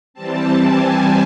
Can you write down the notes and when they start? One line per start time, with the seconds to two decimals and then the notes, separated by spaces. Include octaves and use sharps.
0.14 E3 G3 C4 A5
0.61 G#5